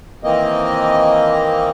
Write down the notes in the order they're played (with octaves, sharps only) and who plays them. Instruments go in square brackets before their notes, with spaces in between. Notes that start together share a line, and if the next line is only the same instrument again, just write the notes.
[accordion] D#3 E3 A#3 C4 D#5